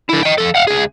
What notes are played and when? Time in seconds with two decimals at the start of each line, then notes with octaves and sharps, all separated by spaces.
0.10 D3 E4
0.23 D#5 G5
0.38 F3 A4
0.55 F5 F#5
0.67 C#2 G#4